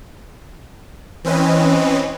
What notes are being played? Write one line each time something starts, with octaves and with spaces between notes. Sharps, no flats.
E3 C4 C#4 B4 D#5